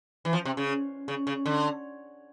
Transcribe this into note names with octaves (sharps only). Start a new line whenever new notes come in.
E3
F3
C3
C#3
C#3
C#3
D3